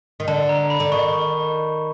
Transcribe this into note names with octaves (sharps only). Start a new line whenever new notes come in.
D#3
D3 A5
A#5
B5
D3
D#3 C#6
C#6